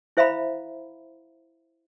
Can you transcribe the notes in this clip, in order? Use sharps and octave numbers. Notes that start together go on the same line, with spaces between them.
E4 C5 E5 F5 A#5 B5